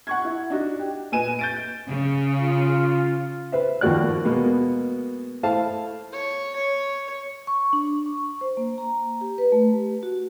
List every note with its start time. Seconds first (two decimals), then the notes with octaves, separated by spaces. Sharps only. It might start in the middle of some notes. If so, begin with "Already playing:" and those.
0.07 F#5 C#6 G#6
0.25 E4
0.50 D4 D#4 F#4
0.80 G4
1.12 A#2 B4 D#5 G#5 D#7 E7
1.39 G6 A6 D7
1.89 C#3
2.42 F4
3.52 B4 C5 E5
3.81 D#2 F3 A#3 F#4 D5 F#6
4.25 B2 G#3 A#3 B3
5.43 A3 E4 C5 F5 A5
6.13 C#5
6.56 C#5
7.47 C#6
7.73 D4
8.06 C#6
8.41 C5
8.57 A#3
8.78 A#5
9.21 G4
9.38 B4
9.52 A3
9.72 G4
10.03 F#4